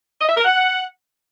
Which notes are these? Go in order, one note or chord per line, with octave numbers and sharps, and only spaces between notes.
D#5
E5
A#4
F#5